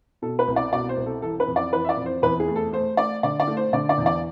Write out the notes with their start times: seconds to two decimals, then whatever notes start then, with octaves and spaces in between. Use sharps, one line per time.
0.22 B2 A4
0.39 B4
0.48 C2
0.56 D5
0.72 B2 D5
0.89 C5
0.97 C2
1.06 A4
1.22 E3 A4
1.40 B4
1.47 F2
1.56 D5
1.72 E3 B4
1.85 E5
1.89 D5
1.97 F2
2.06 C5
2.22 E2 B4
2.40 G#4
2.48 A3
2.56 A4
2.73 A3 C5
2.97 A3 D5
3.23 D3 D5
3.40 D5
3.47 A3
3.57 C5
3.73 D3 D5
3.89 D5
3.98 E2
4.06 D5